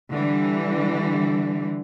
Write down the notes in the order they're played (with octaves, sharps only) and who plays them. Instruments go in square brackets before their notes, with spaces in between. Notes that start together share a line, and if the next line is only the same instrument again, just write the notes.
[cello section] D3 E3 G3